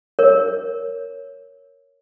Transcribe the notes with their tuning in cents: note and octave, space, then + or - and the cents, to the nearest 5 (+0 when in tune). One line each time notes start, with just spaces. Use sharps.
A#4 +0 C#5 +0